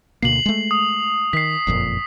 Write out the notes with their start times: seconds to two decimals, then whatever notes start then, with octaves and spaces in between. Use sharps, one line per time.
0.22 D2 B2 A#3 C7 F#7
0.46 G#3 A3
0.71 D#6
1.33 D#3 B6 C7
1.67 F#1 F2 A#2